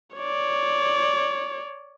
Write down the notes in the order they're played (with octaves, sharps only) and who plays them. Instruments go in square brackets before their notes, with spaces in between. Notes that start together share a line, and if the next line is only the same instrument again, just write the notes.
[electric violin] C#5 D5